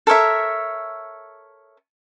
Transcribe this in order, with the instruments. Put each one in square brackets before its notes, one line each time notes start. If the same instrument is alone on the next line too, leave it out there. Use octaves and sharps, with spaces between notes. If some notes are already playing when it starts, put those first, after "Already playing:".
[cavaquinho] A4 A#4 C#5 E5